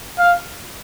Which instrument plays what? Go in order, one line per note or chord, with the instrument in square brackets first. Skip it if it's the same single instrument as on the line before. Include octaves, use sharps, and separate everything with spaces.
[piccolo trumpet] F5